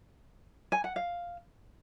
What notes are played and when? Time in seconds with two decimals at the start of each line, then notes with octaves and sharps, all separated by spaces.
0.72 G#5
0.84 F#5
0.96 F5